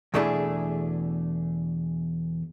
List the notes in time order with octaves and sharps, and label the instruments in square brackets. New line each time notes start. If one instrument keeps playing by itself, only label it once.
[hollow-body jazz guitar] E2 B2 A3 D4 E4 G#4